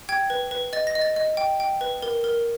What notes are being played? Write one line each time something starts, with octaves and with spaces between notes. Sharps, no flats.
G5 G#6
B4
B4
D#5 A6
A#6
D#5
A6
D#5
G5
G5
B4
A#4
A#4